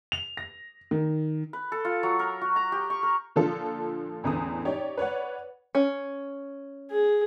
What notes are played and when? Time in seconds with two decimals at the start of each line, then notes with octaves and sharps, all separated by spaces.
0.12 F7
0.37 A#6
0.91 D#3
1.53 B4
1.72 A4
1.85 F4
2.03 F#3
2.19 A#4
2.41 F#4
2.56 A#5
2.72 G4
2.90 C#6
3.03 A#4
3.36 A#2 D3 F3 F4 A4
4.24 A1 E2 D3 D#6
4.65 D#4 G4 C#5 D5
4.97 B4 C#5 D5 F#5
5.75 C#4
6.91 G#4